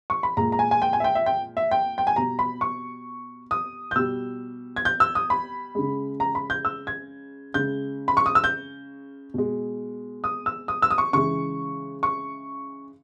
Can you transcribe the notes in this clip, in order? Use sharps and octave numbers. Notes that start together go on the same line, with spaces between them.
C#6
B5
A#2 G#3 A#5
A#5
G#5
G#5
G5
G#5
E5
G5
E5
G5
E5
G5
G5
G#5
B2 G3 A#5
B5
C#6
D#6
G6
B2 G3 E6
G#6
G6
E6
D#6
B5
C#3 G#3
A#5
B5
G6
E6
G#6
C#3 G#3 G6
B5
C#6
D#6
E6
G6
B2 G#3
D#6
E6
D#6
E6
D#6
C#6
C#3 E3 G#3 C#6
C#6